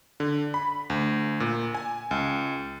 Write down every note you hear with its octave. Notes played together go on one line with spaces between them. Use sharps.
D3
B5
D2
A#2
G#5
C#2